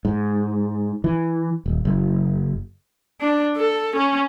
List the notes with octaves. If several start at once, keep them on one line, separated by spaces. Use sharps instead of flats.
G#2
E3
D#1
F#1
D4
A4
C#4